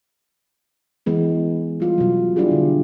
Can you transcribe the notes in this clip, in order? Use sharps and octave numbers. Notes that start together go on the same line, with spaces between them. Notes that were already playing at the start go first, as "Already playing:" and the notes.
E3 G#3 B3
G3 F4
B2 F#3
G3 D4 E4 F4 G4 G#4
D3